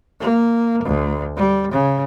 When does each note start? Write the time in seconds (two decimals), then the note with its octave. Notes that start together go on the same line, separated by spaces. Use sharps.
0.20 A#3
0.84 D2
1.37 G3
1.72 C#3